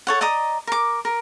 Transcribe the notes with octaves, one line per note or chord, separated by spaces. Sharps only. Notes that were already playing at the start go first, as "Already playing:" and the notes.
A4 C#5 F#5
D5 D#5 A#5 D#6
A#4 D6
A#4